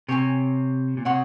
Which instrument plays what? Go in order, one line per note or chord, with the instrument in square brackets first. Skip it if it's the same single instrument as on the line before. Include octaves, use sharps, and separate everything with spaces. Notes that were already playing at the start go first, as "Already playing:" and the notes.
[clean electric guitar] C3 [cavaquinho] C#5 G#5 C#6
[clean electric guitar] A#2
[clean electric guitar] C3 [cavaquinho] C#5 F#5 C6 D#6